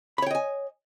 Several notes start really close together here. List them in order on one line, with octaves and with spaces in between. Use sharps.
B5 C#5 G5 D#5 G#5